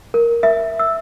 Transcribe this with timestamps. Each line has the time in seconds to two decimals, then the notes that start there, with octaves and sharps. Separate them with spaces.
0.14 A#4
0.43 E5
0.79 E6